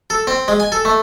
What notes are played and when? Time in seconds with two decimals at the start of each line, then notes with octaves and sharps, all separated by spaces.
0.10 A4
0.27 C4
0.48 G#3
0.60 G#5
0.72 A4
0.85 A3